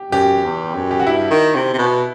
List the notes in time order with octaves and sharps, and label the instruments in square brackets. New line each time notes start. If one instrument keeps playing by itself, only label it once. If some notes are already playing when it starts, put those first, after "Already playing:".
Already playing: [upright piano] G4
[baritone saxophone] F#2 [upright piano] G4
[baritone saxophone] E2
F#2
[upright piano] G4
F#4
[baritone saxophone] G2 [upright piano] E4
[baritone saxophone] D#3
C3
C3
B2